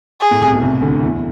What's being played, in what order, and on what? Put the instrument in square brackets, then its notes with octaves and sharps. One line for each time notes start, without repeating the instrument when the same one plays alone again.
[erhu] G#4
[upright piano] A2
C2 C3
B1 B2
C2 C3
D2 D3
E2 E3